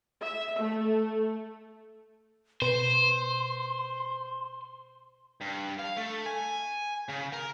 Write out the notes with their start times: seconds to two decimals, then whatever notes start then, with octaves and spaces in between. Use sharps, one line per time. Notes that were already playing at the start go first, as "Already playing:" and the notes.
0.22 E5
0.58 A3
2.62 B2 B4 C5 C6 E7
5.41 G2
5.79 F5
5.97 A3
6.26 G#5
7.08 C#3
7.33 A#4